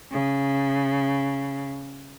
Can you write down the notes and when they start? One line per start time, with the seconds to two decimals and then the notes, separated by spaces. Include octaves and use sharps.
0.12 C#3